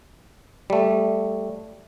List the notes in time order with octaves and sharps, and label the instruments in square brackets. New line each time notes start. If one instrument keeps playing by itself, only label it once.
[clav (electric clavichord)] G3 A3